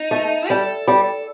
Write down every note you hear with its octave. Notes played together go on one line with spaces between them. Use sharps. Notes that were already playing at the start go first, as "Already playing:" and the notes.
Already playing: D#4
A3
G3 A4
G3